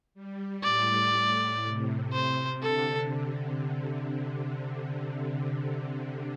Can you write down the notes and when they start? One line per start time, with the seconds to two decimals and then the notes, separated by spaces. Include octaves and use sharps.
0.14 G3
0.63 A2 D5
1.64 C3
2.13 C5
2.62 D3 A4